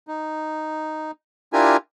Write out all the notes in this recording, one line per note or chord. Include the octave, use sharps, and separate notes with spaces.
D#4
D4 E4 F4 G4 A#4 G#5